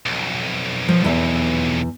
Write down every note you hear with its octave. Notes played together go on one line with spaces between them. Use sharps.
B1 F2
F3
E2 E5